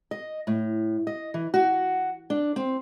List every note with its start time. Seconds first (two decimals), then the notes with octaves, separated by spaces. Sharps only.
0.11 D#5
0.47 A2
1.07 D#5
1.34 E3
1.54 F#4
2.30 D4
2.56 C4